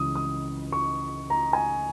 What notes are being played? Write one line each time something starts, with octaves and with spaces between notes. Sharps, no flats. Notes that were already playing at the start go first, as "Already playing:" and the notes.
Already playing: C#2 C#3 E3 D#6
D#6
C#6
A#5
G#5